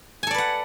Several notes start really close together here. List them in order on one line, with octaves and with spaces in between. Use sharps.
G#5 A4 D5 B4 F#5